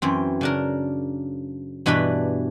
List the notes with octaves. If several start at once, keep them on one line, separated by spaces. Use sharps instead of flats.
F#2 E3 C4
C#3 D4 A#4
G2 B2 E3 D4 B4 B5